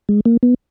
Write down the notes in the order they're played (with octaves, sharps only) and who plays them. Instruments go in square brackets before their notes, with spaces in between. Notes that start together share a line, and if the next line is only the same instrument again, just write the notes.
[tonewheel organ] G#3
A#3
B3